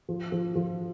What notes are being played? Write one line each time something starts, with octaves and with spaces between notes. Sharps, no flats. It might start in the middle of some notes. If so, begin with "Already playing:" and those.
F3
F3
F3